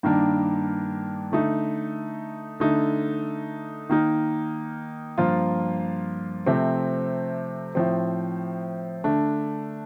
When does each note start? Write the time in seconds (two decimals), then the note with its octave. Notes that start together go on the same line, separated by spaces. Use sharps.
0.03 G2 D#3 A#3 D4
1.32 D3 A3 D#4
2.60 D3 A3 D#4
3.89 D#3 A#3 D#4
5.18 G2 F3 A#3 F4
6.47 C3 F3 A3 C4
7.75 A2 F3 C4
9.04 D3 A3 D4